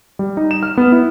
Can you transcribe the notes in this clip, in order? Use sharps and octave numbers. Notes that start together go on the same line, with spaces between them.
G3
D#4
E7
F6
B3
E4